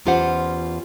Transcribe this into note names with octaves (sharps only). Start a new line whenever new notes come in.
E2 C#4 F4 G4 C5 F#5